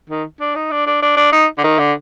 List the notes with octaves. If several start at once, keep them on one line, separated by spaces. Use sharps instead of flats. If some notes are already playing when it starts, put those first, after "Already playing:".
D#3
D4
D#4
D4
D4
D4
D4
D#4
D3
D#3
D3